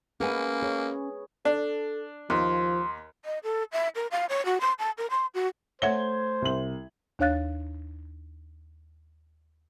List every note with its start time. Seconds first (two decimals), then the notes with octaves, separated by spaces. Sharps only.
0.20 A#3 C#4 G#4 B4 F#5 G#5
0.62 G#4 C#5
1.45 D4 A4
2.30 D#2 F3 C6
3.25 D#5
3.43 A4
3.72 E5
3.95 A#4
4.11 F5
4.29 C#5
4.45 F#4
4.61 C6
4.79 A5
4.98 A#4
5.11 C6
5.34 F#4
5.82 A3 C5 C#5 E5 F#5 G#6 G7
6.42 C2 F#7
7.19 D#2 D4 C#5 F5 F#6 A6